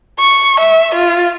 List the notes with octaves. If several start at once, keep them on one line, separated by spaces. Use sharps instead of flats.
C#6
E5
F4